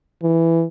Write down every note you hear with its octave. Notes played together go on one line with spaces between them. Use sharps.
E3